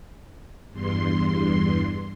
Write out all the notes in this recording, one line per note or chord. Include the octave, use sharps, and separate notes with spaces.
E2 G2 C6